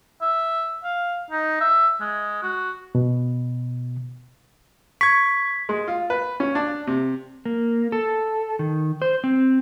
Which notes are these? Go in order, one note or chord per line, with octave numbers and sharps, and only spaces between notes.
E5
F5
D#4
E5
G#3
F#4
B2
C#6 G#6 B6
G#3
F4
B4
C#4
D4
C3
A#3
A4
D#3
C5
C4